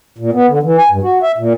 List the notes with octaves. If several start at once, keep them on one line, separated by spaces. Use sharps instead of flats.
A#2
B3
D3
E3
G#5
G2
F#4
E5
A#2